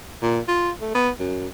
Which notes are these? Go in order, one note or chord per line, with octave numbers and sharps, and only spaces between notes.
A#2
F4
A3
B3
F#2